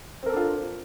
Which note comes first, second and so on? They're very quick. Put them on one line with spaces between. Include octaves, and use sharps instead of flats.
C4 A#4 A4 D4 F4